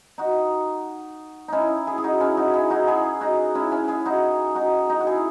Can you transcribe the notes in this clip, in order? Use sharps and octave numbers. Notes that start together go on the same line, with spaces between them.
D#4 F#4
C#4 D#4 E4
E4 G#4
G#4
D#4 F#4
C#4 E4
D#4 F#4
E4 G#4
D#4 F#4
E4 G#4
D#4 F#4
C#4 E4
C#4 E4
E4 G#4
D#4 F#4
D#4 F#4
D#4 F#4
F#4
E4 G#4